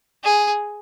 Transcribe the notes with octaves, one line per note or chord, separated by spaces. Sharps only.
G#4